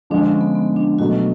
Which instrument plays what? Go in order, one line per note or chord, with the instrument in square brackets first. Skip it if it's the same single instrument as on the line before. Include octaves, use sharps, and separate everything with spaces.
[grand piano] D3 F3 G#3 [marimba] D4
[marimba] C#4
B3
B3
D4
[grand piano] B2 F#3 A3 [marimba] F#4